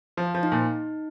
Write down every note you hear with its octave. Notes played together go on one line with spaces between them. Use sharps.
F3
F3
D#4
A#2